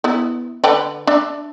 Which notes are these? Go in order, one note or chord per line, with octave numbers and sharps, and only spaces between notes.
B3 E4
D3 B4 G5
D4 E5